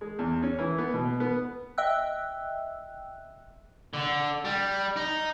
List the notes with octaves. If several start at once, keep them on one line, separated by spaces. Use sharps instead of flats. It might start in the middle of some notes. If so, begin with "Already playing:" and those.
G#3
E2
C#4
E3
B3
B2
B3
D#5 E5 G5 E6 F#6
D3
G3
D#4